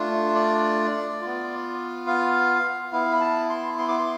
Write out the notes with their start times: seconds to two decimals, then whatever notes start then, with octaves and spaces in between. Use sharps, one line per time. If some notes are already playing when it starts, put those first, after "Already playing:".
Already playing: A3 D4 F4
0.35 D5
1.21 B3 F4
2.07 F5
2.92 B3 E4 F5
3.11 B5
3.21 A5
3.50 C6
3.78 C6
3.88 D6
3.98 C6